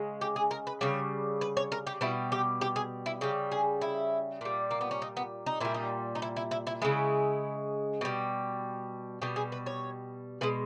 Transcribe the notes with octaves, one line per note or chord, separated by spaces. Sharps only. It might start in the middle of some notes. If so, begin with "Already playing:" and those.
Already playing: C#3 G#3
G4
G#4
A#4
B4
C#3 G3 C#5
B4
C#5
A#4
G4
B2 G3 E4
G4
G4
G#4
E4
C#3 G3 G4
G#4
E4
A#2 G3
A#3
B3
C#4
D#4
B3
D#4
A#2 G3 E4
D#4
D#4
E4
E4
E4
E4
C#3 G#3 E4
B2 G3
B2 G3 G4
G#4
B4
C#5
B2 G#3 B4